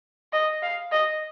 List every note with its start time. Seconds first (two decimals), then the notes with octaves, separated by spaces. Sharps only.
0.33 D#5
0.63 F5
0.92 D#5